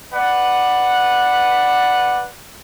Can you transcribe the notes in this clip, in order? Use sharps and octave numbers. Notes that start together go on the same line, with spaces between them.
B4 D5 F#5